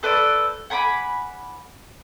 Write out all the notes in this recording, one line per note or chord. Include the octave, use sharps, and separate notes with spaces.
A4 B4 C5 D5
F#5 G#5 B5 D6